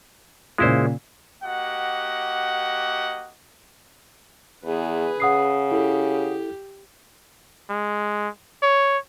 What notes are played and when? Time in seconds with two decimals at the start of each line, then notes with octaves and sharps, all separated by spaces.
0.58 A#2 C#3 G#3 E4 F4 C5
1.43 A#3 F#4 G4 D#5 F#5
4.65 E2 G#4 B4
5.20 C#3 F#5 D#6 C7
5.72 E4 G4 A4
7.69 G#3
8.63 C#5